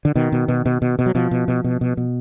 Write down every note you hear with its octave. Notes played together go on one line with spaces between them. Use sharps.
D3
B2 D#3
B2
B2
B2
B2
B2
F#3
B2 F3
B2
B2
B2
B2
B2